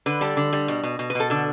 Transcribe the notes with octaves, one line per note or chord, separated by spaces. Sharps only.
D3 B4
G3 A4
D3
G3
B2
B2
B2
B4
B2 A4
D3 A4